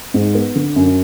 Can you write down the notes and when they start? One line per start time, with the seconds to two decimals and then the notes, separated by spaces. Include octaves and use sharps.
0.14 G#2
0.35 B3
0.55 D3
0.76 F#2